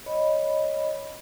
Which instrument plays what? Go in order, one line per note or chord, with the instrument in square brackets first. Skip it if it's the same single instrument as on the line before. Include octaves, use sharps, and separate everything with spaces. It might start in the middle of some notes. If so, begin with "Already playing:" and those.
[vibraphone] C#5 D#5 B5